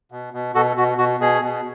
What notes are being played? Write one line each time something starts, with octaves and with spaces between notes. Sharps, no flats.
B2
B2
B2 F#4 A4
B2 F#4
B2 F#4
B2 G#4
B2